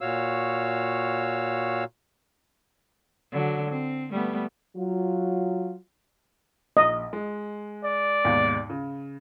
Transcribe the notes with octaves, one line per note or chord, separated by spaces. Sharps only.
A#2 F#4 C#5 F5 E6
D3 F#3
C4
G3 A3 B3
F#3 F4
A#1 D#5
G#3
D5
D#2 G#2 B2
C#3